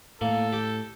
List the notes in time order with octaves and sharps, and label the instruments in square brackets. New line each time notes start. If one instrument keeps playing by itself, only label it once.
[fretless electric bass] A2 [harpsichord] A#3 [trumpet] A4
[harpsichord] G4